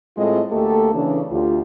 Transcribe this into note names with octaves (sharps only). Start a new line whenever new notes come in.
A2 G#3 C4 F4 A4 D#5
D2 A3 A#3 G4 A4
C#3 E3 C#4 D4
D2 F4 G4